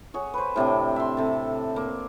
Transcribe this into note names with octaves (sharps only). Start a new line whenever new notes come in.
F#4 G#4 C#5
B4 C5
A2 C3 D4 G5
E5 C6
C3 A4
A#3